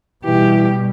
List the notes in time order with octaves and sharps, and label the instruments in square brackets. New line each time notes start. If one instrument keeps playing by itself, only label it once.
[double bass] B2 G3 [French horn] E3 [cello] G4